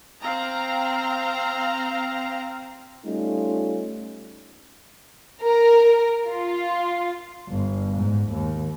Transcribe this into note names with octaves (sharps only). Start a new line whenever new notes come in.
C4 F5 A#5
G3 A3 C#4 D#4 F4
A#4
F4
G1
G#2
D#2